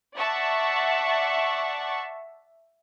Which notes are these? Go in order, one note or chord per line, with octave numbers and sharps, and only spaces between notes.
D5 E5 F#5 A5 C#6